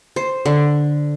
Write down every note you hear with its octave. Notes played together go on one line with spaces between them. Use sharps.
C5
D3